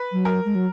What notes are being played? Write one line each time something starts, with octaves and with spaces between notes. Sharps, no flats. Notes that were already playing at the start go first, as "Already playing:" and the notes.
Already playing: B4
F#3
A#4
G#3
F#3